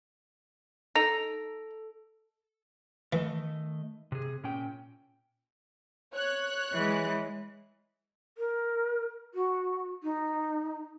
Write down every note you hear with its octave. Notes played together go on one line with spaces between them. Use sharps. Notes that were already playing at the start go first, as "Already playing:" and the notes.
D#4 A4 A#6 F7
D#3 E3 A3 D#5
C3 G#4
A#2 C#4 G5
C#5 F#6
E3 G#3
A#4
F#4
D#4